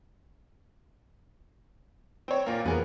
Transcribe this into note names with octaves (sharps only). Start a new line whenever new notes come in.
C4 C#5
A#2 A#3
E2 B3 G#4 A#4